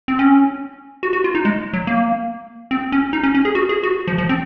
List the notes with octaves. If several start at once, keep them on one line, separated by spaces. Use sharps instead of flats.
C4
C#4
F#4
F#4
F4
D#4
G#3
F#3
A#3
C4
C#4
D#4
C#4
C#4
G#4
F#4
G#4
F#4
F3
F3
C4